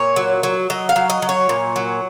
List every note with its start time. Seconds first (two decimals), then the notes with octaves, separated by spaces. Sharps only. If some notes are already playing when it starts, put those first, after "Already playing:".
Already playing: A#2 C#5
0.16 F#3
0.43 F#3
0.70 F#3 D#5
0.89 F5
0.96 F#3
1.10 D#5
1.22 F#3
1.29 C#5
1.49 A#2
1.76 F#3